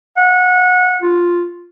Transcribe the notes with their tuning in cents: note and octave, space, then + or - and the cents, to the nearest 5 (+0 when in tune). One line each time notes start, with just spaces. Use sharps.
F#5 -25
F4 +0